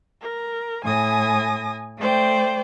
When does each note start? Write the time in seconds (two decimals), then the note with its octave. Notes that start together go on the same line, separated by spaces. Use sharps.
0.20 A#4
0.84 A2 G#5 D#6 A#6
1.98 A3 C5 D5 G5